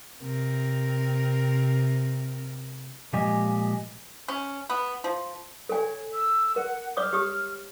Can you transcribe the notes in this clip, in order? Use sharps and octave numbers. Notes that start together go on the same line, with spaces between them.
C3 C4 A#4
A#2 F3 G#3 G4 D#5 G#5
C#4
B3
F3
A4 C#5 G#5
E6
A#4 F#5
C#5 D6 D#6 F6
G4 D#6